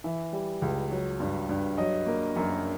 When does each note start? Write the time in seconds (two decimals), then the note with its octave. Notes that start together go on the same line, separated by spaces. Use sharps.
0.04 E3 E5
0.33 G3
0.62 C#2
0.91 F#3
1.20 G2
1.49 G2
1.77 F#3 D#5
2.06 A#3
2.36 F#2